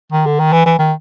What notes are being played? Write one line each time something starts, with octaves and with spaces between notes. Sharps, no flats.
D#3
D3
D#3
E3
E3
D#3